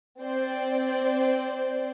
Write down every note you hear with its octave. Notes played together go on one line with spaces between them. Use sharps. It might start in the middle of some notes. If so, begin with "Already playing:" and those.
C4 C5 D5